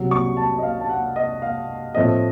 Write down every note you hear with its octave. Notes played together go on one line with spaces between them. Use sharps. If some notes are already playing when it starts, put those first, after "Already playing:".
Already playing: C2 C3 F#3
C#6
A5
D#5
F5
A5
F#5
D#5
F5
A2 F3 A3 C4 D#5